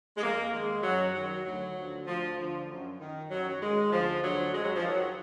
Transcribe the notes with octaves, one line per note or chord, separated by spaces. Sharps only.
G#3
F2 A#3
D#3 G#3
F#2 F#3
D#3 F#3
D2 F#3
D3 F3
D2 F3
D3 F3
F#2
D#3
F#2 F#3
F#3
D#3 G#3
D2 F3
D3 F3 F#3
F2 G#3
F#3
F3
D#3 F#3